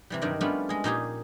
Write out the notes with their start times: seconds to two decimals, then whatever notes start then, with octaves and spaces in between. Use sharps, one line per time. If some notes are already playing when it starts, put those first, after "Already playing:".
0.10 C3 E3 G3
0.22 G2 D#3 F#3 G3 D4
0.41 G3 A3 B3 C#4 D4 F4
0.69 G#3 G#4
0.84 A#2 D#4 G4 G#4